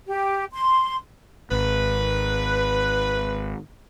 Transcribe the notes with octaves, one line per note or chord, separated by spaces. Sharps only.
G4
C6
G#1 B4